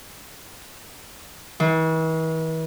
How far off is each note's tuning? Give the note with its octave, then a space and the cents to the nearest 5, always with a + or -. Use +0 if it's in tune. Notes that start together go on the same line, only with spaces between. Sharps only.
E3 -40